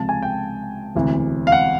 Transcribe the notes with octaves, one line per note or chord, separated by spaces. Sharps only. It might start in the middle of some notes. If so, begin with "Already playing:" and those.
Already playing: C#2 C3 F3 A5
G#5
G5
E1 D2 C3 E3
F5
F#5